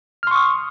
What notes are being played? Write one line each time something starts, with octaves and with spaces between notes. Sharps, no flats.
C6 C#6 D#6 F6